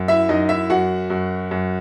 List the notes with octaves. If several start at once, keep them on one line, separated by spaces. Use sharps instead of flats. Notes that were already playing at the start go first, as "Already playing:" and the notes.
Already playing: F#2
E4 E5
F#2 D#4 D#5
E4 E5
F#2 F#4 F#5
F#2
F#2